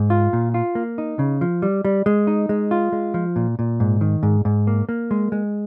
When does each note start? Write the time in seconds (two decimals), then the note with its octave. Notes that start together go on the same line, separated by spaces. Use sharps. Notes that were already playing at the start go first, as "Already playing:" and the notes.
Already playing: G#2
0.10 F4
0.33 A#2
0.54 F4
0.75 A#3
0.98 D#4
1.19 C#3
1.41 F3
1.62 G3
1.85 G3
2.06 G#3
2.27 D#4
2.49 G#3
2.71 F4
2.92 G#3
3.14 F3
3.36 A#2
3.59 A#2
3.80 G#2
4.01 D#3
4.23 G#2
4.45 G#2
4.67 A#3
4.89 A#3
5.11 G#3
5.32 G#3